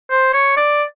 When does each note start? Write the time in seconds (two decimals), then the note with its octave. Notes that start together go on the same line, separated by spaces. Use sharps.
0.11 C5
0.34 C#5
0.57 D5